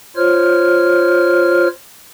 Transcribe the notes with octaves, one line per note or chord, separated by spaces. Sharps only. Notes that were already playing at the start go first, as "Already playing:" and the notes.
F4 C5 C#5 F6